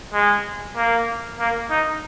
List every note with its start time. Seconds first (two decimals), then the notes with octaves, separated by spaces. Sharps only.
0.14 G#3
0.76 A#3
1.40 A#3
1.70 D#4